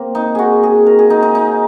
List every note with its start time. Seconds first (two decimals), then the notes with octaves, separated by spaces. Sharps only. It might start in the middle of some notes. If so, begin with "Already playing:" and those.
Already playing: A#3 C4
0.15 D#4
0.35 F#4 G#4
0.63 G#4
0.87 A#4
0.99 G#4
1.10 D#4
1.22 D#4
1.35 D#4